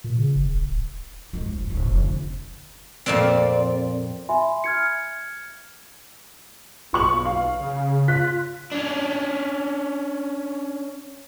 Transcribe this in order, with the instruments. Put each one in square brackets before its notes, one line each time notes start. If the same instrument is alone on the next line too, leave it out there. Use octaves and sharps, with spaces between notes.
[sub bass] A#2
C#3
G1
D#1
D1
[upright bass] F#2 G#3
C2
G1
D1 B1
F1
D3
[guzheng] F2 A#2 C4 [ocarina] D5
[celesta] E5 G#5 B5 C6
F6 G#6 C#7
[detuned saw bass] B1 [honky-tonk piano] F4 C#6 F#7
[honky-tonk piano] F5
[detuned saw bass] C#3
[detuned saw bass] F4 [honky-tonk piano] F#6 B6
[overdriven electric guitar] C#4 D4